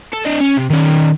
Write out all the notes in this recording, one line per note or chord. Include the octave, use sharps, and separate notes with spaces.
A4
D4 D#5
C#4
C3
D#3 C#4